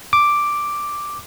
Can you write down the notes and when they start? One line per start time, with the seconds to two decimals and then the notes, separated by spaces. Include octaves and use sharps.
0.13 D6